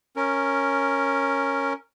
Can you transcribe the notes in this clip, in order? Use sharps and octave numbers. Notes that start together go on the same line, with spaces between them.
C#4 A#4